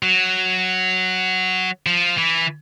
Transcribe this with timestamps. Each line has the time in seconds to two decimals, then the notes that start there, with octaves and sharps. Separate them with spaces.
0.03 F#3
1.86 F3
2.18 E3